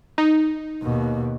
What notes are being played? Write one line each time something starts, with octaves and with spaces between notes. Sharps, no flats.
D#4
D#2 B2